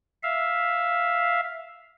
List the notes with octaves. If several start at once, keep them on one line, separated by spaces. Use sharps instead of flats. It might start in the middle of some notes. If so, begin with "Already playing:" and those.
E5 F5